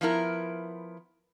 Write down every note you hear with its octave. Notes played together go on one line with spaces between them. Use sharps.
F3 B3 E4 A#4